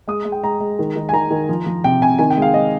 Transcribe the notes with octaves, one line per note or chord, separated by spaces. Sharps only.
G#3 D#6
G#3
G5
G#3 A#5
G#3
D#3
D#3
G#5
D#3 A#5
D#3
F3
F3
C3 G5
C3 G#5
D#3 G#5
G5
G#3 F5
G#3 D#5